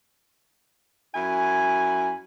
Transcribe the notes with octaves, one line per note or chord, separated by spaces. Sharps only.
F#2 E4 G#5